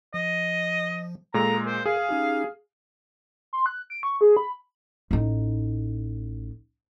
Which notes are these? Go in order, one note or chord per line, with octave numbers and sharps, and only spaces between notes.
F3 D#5
A#2 G#3 A4 A#5 D#6
A#4 C5
G#4 F5
C#4 D#4 G4
C6
F#6
D7
C#6
G#4
B5
A1 D#4